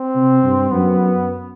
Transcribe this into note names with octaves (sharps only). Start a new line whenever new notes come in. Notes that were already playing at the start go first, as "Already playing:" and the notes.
Already playing: C4
C3
G2
F#2 B3